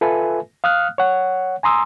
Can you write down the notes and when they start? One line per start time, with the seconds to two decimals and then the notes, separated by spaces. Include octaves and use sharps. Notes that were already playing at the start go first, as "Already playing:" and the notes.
0.01 F4 A4 B4 E5 G#5
0.64 F5 D#6 F6 F#6
0.98 C#5 F#5
1.63 G#5 A#5 C6 D#6 E6